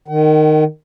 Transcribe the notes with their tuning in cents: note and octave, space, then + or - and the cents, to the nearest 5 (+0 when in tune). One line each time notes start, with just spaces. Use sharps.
D#3 -15 F#5 +45